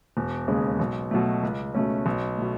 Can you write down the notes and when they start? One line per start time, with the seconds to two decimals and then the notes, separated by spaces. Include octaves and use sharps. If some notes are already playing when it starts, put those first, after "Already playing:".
0.17 E1
0.48 D#2 C#3 G#3
0.79 B1
1.11 B2 F#3 A3
1.43 C#2
1.75 B2 A3 C#4
2.06 B1
2.38 B2 A3